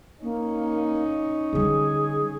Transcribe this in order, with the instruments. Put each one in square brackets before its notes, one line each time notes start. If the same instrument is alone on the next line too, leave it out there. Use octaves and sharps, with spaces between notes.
[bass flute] A#3 [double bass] C#4 D#4
[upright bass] D3 G3 [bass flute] G#4